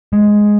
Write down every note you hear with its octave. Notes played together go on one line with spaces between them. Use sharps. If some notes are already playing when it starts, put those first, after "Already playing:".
G#3